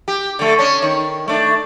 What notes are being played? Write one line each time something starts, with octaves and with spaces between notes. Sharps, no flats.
G4
D3 A3
C#4 D4
D#3
A3 D4